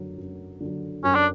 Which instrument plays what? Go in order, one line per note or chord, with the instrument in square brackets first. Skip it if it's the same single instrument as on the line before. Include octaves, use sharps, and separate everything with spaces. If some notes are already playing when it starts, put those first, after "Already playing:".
Already playing: [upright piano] F#2 D3 F#3
F#2
D3 F#3
[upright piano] F#2 [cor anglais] C#4
[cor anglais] D4